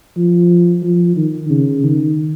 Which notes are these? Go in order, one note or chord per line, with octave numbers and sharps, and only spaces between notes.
F3
F3
D#3
C#3
D#3